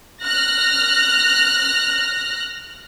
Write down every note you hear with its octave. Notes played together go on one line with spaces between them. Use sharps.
F6 F#6 A#6